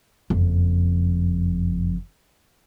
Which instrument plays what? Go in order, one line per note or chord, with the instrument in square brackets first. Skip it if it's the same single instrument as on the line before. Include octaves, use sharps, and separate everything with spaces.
[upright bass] F#1 F2